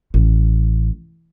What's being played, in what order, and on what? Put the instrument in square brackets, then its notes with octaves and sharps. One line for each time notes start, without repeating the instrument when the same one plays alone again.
[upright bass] A1